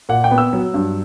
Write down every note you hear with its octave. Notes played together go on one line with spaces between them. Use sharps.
A#2 F#5
G5
B3
E6
F#3
G2